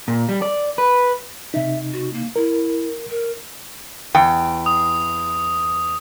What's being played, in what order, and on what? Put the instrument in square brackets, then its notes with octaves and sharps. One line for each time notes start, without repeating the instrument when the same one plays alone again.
[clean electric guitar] A#2
G3
D5
B4
[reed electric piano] C3 D#4 [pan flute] E5
[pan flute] F#4
A#3
[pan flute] E4 [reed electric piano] A#4
[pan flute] A#4
[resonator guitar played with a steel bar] E2 G5
[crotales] D#6